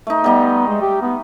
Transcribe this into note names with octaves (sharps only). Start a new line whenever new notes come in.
A3 D#4
G3 B3 D#4 D#5
G#3
G4
B3